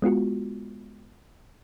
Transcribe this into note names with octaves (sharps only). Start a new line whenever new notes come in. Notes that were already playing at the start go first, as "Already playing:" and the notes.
G#3 B3 F4 F#4